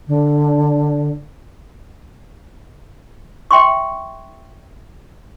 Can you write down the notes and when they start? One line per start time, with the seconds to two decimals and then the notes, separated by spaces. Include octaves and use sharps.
0.08 D3
3.51 E5 G5 C6 C#6